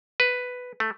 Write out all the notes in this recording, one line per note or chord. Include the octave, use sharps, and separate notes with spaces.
B4
A3